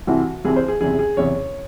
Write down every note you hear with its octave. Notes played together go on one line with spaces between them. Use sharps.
C2 C3 E3 C4 E4 F#4
C2 C3 E3 C4 E4 G#4
C5
G#4
F#1 E2 C3 G#4
G#4
F#1 E2 C3 C#5